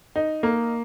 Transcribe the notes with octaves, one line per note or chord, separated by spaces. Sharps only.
D#4
A#3